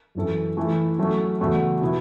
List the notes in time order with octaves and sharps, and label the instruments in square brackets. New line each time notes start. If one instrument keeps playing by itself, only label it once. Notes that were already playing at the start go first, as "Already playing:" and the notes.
[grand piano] F#2 E3 C#4 A4
E3 A3 E4
F#3 A3 C#4
E2 C#3 A3 F#4
B2 B3 E4